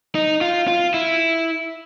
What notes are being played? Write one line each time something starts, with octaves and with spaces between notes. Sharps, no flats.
D#4
F4
F4
E4